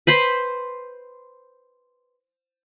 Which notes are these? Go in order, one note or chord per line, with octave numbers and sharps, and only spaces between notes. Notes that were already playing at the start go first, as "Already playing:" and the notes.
B4 C5 B5 C6